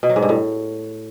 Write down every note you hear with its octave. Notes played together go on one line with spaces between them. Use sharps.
B2
F#3
G#2
G2
A2